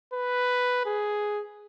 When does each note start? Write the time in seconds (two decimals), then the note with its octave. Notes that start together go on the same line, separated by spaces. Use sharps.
0.13 B4
0.86 G#4